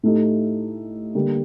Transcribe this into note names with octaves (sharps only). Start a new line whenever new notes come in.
A2 A3 D#4 G4
D3 G3 A#3